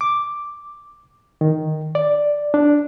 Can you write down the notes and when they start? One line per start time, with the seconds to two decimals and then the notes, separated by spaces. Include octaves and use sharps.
0.01 D6
1.41 D#3
1.95 D5
2.54 D4